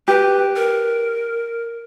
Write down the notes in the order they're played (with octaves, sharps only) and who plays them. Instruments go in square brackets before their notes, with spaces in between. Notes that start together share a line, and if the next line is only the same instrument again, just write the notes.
[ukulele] G4 [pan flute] B4
[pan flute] A#4